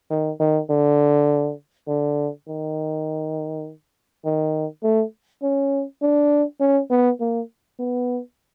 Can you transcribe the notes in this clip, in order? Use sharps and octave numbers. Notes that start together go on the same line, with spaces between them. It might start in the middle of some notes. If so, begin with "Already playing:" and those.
D#3
D#3
D3
D3
D#3
D#3
A3
C#4
D4
C#4
B3
A#3
B3